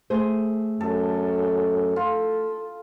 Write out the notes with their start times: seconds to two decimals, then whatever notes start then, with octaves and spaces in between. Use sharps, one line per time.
0.10 A3 G#4 C5
0.81 F#2 A4
1.96 F4 A4